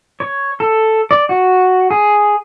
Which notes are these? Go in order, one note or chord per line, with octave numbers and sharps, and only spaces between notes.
C#5
A4
D5
F#4
G#4